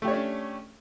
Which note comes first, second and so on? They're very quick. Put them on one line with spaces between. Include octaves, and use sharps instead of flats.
A3 G4 C#5 D4 C#4